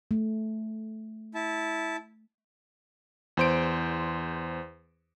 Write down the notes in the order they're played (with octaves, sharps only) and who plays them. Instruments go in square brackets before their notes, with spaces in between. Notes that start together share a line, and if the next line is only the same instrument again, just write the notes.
[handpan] A3
[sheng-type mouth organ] E4 A5
[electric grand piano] E2 C5 D7